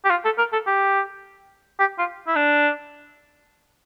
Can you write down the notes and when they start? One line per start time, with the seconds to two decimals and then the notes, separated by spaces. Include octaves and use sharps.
0.05 G4
0.10 F4
0.25 A4
0.38 A#4
0.53 A4
0.67 G4
1.79 G4
1.99 F4
2.27 E4
2.36 D4